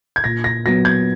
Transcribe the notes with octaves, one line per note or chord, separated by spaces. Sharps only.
G#6
A#2 A#6
A#6
F#3 B3 A#6
G#6